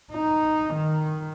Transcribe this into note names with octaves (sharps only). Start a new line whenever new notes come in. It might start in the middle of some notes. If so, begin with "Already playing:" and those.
D#4
D#3